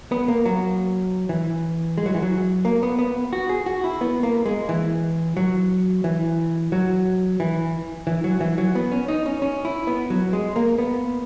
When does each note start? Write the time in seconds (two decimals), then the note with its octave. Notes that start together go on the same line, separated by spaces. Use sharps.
0.12 B3
0.28 A#3
0.46 F#3
1.29 E3
1.98 G#3
2.06 F#3
2.14 E3
2.23 F#3
2.65 A#3
2.83 B3
2.99 B3
3.33 F#4
3.49 G#4
3.66 F#4
3.84 E4
4.01 B3
4.23 A#3
4.46 G#3
4.69 E3
5.37 F#3
6.04 E3
6.72 F#3
7.40 E3
8.07 E3
8.24 F#3
8.40 E3
8.58 F#3
8.75 B3
8.92 C#4
9.08 D#4
9.26 C#4
9.42 C#4
9.65 E4
9.87 B3
10.10 F#3
10.33 G#3
10.56 A#3
10.78 B3